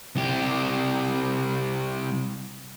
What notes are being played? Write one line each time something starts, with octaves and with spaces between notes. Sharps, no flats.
C2 G4